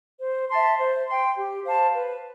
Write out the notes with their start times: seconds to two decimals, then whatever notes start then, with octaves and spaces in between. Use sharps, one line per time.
0.20 C5
0.50 E5 A5 C6
0.78 C5
1.06 C6
1.11 G5
1.36 G4
1.64 C5 F5 A5
1.92 B4